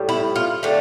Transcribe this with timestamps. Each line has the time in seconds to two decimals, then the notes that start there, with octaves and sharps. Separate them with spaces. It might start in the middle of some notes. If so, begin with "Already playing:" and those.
Already playing: A2 G3
0.09 E4
0.36 F4
0.63 D3 A3 G4